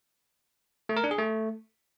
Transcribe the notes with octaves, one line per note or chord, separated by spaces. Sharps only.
A3
A#4
D4
G#4
A3